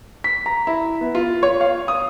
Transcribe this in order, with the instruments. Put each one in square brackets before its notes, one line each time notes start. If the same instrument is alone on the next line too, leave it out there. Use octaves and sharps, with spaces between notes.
[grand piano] B6
A#5
E4
B3
F4
C#5
F5
D#6